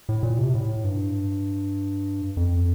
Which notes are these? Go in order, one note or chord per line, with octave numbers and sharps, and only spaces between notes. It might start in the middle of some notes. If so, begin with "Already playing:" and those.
A2
A#2
C3
A2
G2
F2